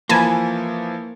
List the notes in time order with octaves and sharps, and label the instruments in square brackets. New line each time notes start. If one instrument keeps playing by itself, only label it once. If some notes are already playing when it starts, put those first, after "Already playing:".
[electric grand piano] E3 F3 [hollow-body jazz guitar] A#3 [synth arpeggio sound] G#5 A5 B5